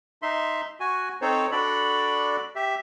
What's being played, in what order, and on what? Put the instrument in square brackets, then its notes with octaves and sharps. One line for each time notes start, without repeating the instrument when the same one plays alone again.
[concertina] D#4 E5 C6
F#4 G#5
C4 D#4 A4 C5 C#5
D4 F#4 A4 D5 B5
G4 E5